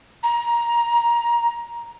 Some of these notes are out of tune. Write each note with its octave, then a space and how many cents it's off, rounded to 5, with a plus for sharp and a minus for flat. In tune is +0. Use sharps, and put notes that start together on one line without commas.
A#5 +15